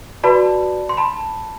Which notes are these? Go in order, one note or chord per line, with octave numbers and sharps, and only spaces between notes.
F#4 B4 D5 A5 B5
C6
A5 B5